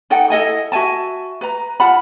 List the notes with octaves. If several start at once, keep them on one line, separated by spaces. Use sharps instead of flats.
D#4 A4 F#5 G5
E4 A4 D#5 G#5
F#4 E5 G#5 A5
B4 A#5
F4 F#5 A5 B5